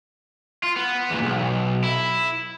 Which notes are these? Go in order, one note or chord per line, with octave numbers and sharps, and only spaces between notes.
F4
B3
E2 A#2
B1
E4